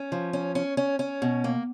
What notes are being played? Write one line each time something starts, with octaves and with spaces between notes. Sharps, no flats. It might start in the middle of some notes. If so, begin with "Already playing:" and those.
Already playing: C#4
F3
C#4
C#4
C#4
C#4
B2
A#3